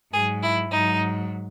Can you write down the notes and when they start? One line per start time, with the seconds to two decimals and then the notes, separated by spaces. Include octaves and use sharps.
0.13 G#2 F#3 G#4
0.42 E4
0.71 G#2 F#3 D#4